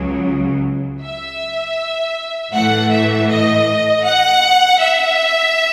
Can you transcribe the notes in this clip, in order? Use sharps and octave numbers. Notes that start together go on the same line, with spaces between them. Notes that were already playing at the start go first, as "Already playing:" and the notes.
Already playing: C#2 C#3 F#3
E5
A2 E3 A3 F#5
E5
D#5
F#5
E5